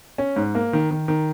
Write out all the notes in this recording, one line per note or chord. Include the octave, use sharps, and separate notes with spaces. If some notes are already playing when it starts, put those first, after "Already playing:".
C#4
G#2
A#3
D#3
D#3
D#3